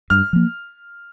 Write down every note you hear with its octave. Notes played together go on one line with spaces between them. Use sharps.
G2 F6
F3 A#3